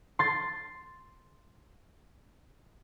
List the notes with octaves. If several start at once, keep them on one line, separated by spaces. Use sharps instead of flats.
C6 A6